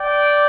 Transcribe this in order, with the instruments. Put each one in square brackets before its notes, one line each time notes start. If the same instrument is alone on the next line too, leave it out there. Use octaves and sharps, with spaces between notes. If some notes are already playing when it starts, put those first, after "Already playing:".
Already playing: [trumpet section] D5 G5